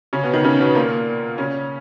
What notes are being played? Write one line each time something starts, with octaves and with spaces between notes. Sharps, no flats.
C#3 C#4
B2 B3
D#3 D#4
C#3 C#4
B2 B3
A#2 A#3
C#3 C#4